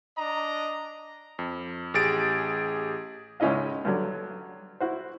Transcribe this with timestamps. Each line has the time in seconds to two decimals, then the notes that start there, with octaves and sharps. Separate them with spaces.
0.18 D4 D#5 A#5
1.39 F2
1.94 A1 G4 G#4 A6 D7
3.40 C#2 G#2 C#4 E4 D#5 F5
3.85 G2 D3 F#3
4.80 E4 F#4 C5